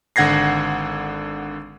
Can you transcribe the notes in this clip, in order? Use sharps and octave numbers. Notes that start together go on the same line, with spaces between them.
G#1 D3 F#5 G#6 A#6 C7